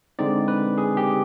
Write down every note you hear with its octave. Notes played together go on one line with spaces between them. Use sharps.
D3 G#3 C4 D#4 D5
B4
G#4
G4